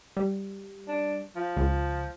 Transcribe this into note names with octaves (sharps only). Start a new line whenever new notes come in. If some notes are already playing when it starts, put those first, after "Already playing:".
G3
D4
F3
C#2